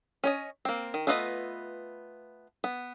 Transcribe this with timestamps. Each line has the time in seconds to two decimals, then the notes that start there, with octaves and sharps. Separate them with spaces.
0.24 C#4 C#5 D#5
0.65 A#3 C4
0.94 D#3
1.07 A3 B3 F4 B4 D#5
2.64 B3